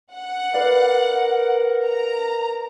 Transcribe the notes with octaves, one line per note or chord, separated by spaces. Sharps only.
F#5
A#4 B4 D5 F5
A#5